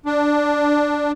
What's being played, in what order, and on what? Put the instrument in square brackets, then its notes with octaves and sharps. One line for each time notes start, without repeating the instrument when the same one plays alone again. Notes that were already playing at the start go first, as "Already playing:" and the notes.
[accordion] D4